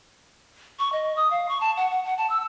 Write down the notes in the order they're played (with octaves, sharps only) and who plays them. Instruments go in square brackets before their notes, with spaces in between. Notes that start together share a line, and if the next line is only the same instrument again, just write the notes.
[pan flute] C#6
D#5
D#6
F5
C#6
A5
F#5
F#5
F#5
A5
E6